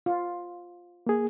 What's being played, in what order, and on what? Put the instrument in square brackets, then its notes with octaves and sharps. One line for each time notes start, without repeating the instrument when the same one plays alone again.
[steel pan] F4
[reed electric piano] A#3 G#4